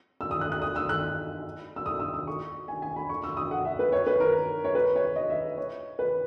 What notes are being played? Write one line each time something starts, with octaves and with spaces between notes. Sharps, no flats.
E6
D#6
F#6
F#6
D#6
E6
F#6
E6
D#6
E6
D#6
C#6
G#5
G#5
B5
C#6
E6
D#6
F#5
E5
B4
C#5
B4
A#4
C#5
B4
C#5
D#5
E5
C#5
B4